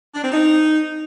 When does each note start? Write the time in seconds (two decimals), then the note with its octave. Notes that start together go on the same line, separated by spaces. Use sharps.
0.15 D4
0.23 C4
0.32 D#4